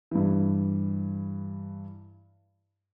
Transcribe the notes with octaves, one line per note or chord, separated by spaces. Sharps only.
G2 E3